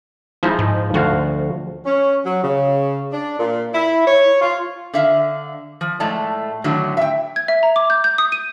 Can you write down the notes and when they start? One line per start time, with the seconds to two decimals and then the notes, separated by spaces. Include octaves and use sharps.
0.43 F3 G#3 D#4 E4
0.59 G#2
0.94 D2 F3 F#4 F5
1.85 C#4
2.25 F#3
2.43 C#3
3.12 D4
3.39 A#2
3.74 E4
4.06 C#5
4.41 F4
4.94 D3 E5 F5
5.81 F3
6.00 A2 G#3 A3 D5 A5
6.64 A2 D3 D#3 F#3
6.97 E5 G5
7.36 G#6
7.48 E5
7.63 A#5
7.76 D6
7.90 G6
8.04 G6
8.18 D#6
8.32 D#7